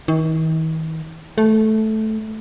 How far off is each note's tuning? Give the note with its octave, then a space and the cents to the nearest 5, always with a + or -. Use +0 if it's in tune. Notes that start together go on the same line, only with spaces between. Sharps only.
D#3 +45
A3 -10